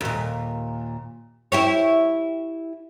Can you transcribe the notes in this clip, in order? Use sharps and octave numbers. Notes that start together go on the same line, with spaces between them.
D#2 A#2
E4 G4 C#5